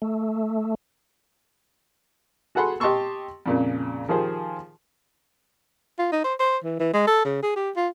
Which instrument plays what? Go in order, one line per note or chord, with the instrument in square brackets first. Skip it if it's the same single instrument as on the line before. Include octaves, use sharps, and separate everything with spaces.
[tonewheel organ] A3
[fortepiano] F#4 G#4 A4 F#5 B5 C6
G4 D#5 A5 C6 C#6 E6
F2 A#2 C#3
D#3 F3 G4 G#4 C5
[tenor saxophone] F4
D#4
C5
C5
E3
E3
G#3
A4
C#3
G#4
G4
F4